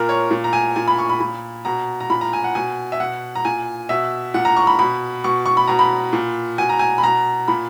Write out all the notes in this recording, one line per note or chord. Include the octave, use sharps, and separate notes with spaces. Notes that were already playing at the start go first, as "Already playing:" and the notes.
Already playing: A#2 A#4
C#5
A#2
A#5
G#5
A#2 G#5
B5
C#6
B5
A#2 B5
B2 A#5
A#5
A#2 B5
A#5
G#5
F#5
B2 G#5
E5
B2 F#5
A#5
A#2 G#5
B2 E5
A#2 F#5
A#5
C#6
B5
B2 B5
B2 C#6
C#6
B5
B2 A#5
B5
A#2
B2 G#5
A#5
G#5
B5
B2 A#5
A#2 B5